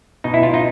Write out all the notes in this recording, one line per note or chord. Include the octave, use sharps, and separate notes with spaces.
B2 D#4
E4
F4
D#4